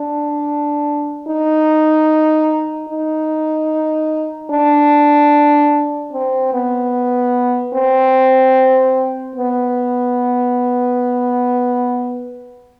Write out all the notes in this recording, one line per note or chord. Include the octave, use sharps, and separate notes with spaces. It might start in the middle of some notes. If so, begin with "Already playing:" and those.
Already playing: D4
D#4
D#4
D4
C4
B3
C4
B3